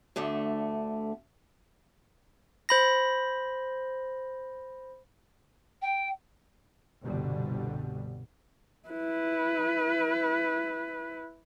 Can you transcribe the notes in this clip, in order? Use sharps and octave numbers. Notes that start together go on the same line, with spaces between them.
D2 D3 A3
C5 B5 A#6
G5
G1 C2 B2 D3 G3
E4 B4